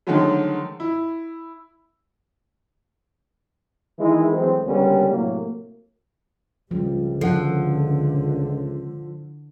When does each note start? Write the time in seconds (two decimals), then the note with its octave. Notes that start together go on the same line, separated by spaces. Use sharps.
0.07 D3 D#3 F3 F#3 G#3 A3
0.80 E4
3.99 D#3 E3 G#3 A#3 E4
4.31 E3 F#3 G#3 A3 C4
4.65 C#2 D3 G3 A#3 B3 C#4
5.08 A2 C3 F#3 A#3
6.71 C#2 F3 G3
7.21 D3 F3 A4 F#5